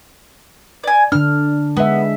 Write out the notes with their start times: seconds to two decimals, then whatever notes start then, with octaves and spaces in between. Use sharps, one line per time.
0.84 D5 G#5
1.12 D3 D4 F6
1.77 G#3 B3 E5